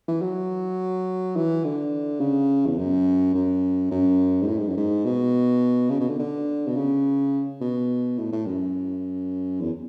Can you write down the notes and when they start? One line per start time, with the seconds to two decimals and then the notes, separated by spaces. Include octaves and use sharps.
0.08 E3
0.21 F#3
1.36 E3
1.64 D3
2.20 C#3
2.66 E2
2.78 F#2
3.34 F#2
3.91 F#2
4.42 G#2
4.48 A2
4.58 G#2
4.68 F#2
4.77 G#2
5.05 B2
5.90 C#3
6.00 B2
6.09 D3
6.19 D3
6.67 B2
6.76 C#3
7.61 B2
8.18 A2
8.32 A2
8.46 F#2
9.61 E2